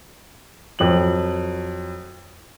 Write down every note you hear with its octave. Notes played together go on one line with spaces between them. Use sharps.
F2 F#3 F#7